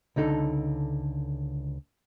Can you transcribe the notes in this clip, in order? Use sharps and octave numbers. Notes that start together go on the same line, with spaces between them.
C#2 D3 D#4 A4